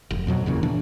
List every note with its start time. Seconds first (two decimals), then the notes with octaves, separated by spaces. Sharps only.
0.11 F1
0.27 F2 B2 F#3
0.46 F#1 E2 A#2 C#3
0.63 C#3 E3 D4